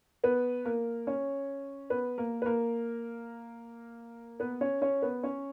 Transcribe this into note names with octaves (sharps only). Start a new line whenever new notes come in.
B3 B4
A#3 A#4
C#4 C#5
B3 B4
A#3 A#4
B4
A#3 A#4
B3 B4
C#4 C#5
C#4 C#5
B3 B4
C#4 C#5